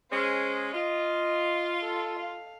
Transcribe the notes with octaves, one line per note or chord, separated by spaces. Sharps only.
G#3 C#4 C5
F4 D#5
A4
F5